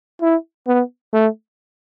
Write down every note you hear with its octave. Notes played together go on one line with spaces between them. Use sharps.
E4
B3
A3